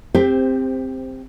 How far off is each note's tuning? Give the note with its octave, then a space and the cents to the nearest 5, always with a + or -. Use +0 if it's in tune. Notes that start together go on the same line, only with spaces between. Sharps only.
C4 +0 G4 +25 C5 -10